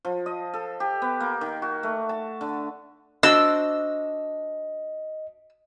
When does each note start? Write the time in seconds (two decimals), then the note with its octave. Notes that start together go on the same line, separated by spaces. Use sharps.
0.05 F3
0.26 D#5
0.54 A4
0.80 G4
1.02 B3
1.20 A#3
1.41 D#3
1.62 F#4
1.83 A3
2.09 A5
2.41 D3
3.23 D4 F#4 C5 D#5 E6